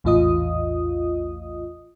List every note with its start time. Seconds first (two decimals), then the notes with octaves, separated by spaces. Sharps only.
0.04 A#1 E2 A2 F4 D#5 D#6